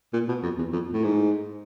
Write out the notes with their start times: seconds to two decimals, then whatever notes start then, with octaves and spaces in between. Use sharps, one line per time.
0.13 A#2
0.28 B2
0.43 F2
0.58 E2
0.73 F2
0.93 A2
1.04 G#2